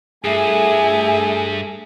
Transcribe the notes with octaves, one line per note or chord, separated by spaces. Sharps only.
G2 A3 G#4 E5 G#5